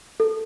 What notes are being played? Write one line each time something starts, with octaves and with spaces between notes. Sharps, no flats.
A4